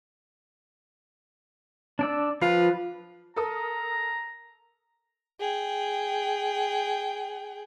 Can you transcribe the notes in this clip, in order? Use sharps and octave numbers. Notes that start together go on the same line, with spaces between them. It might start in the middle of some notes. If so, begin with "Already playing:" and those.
D4 D5 E6
F3 F4 B4
A4 A#4 A#5 D#6
G#4 G5